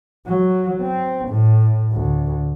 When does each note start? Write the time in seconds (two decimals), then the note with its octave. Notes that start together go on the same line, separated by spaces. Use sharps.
0.27 F#3
0.82 C4
1.29 A2
1.93 D2